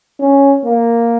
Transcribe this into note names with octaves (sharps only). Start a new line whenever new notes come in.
C#4
A#3